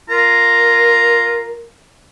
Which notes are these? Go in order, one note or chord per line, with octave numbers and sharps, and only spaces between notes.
F4 A#4 A#5